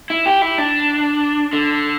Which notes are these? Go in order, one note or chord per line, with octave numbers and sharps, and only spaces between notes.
E4
G4
E4
D4
D3